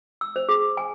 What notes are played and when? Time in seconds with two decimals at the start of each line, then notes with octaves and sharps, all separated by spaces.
0.21 E6
0.36 C5
0.49 G#4
0.77 G#5